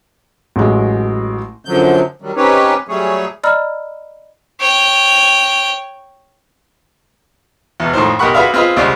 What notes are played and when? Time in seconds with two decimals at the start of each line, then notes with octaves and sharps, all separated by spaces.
0.56 A1 F#3 G#3
1.65 F#2 D3 F3 F#3 G6
2.22 D#3 F#3 G3
2.36 C4 C#4 D#4 G4 B4 C#5
2.88 F#3 G3 A3 G#4 C#5
3.44 D5 D#5 A#5 B5 E6 F6
4.60 C#5 G5
7.80 E2 B2
7.93 F2 A2 D#3 C5
8.19 B1 G4 A#4 F#5 B5 C#6
8.34 F#4 G#4 B4 D5 E5 F5
8.54 C4 F4 G#4 B4 D#5 F5
8.76 C2 C#3 G#3 C4 D5